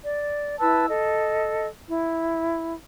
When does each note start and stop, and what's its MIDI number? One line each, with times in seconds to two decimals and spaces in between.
0.04 0.57 74
0.60 0.86 64
0.60 0.86 71
0.60 0.86 81
0.60 0.86 88
0.89 1.67 69
0.89 1.67 75
1.89 2.73 64